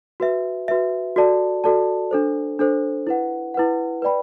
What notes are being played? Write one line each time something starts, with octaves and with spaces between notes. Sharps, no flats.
F#4 B4 E5
F#4 B4 E5
F#4 A4 D5 A5
F#4 A4 D5 A5
D4 A4 C5
D4 A4 C5
E4 B4 F#5
E4 B4 F#5
B4 D5 G5 B5